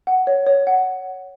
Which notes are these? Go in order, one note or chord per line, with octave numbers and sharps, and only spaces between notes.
F#5
C#5
C#5
F#5